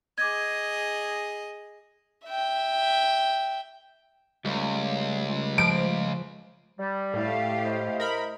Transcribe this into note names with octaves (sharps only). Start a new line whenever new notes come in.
G#4 D#5 D6 G#6
E5 G5
C#2 G3 A3
F3 D7
G3
A2 A3 G4 F5
E4 C5 D#5
A#4 B5